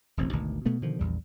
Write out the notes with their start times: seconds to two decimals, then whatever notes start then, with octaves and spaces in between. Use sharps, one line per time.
0.17 E1 A1 C4
0.32 G#1 D2 B2 D#3
0.66 B2 A3 B3
0.82 B2 D3 D#3 F3
0.99 A#1 E2 G3